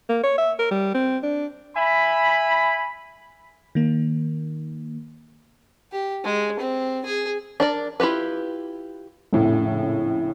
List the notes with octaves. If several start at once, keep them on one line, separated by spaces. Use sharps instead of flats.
A#3
C#5
E5
A#4
G3
C4
D4
E5 G#5 B5
D#3 A#3
G4
G#3
C4
G#4
D4 A#4 D5
E4 F4 G4 B4
A#1 F2 A2 C#3 A3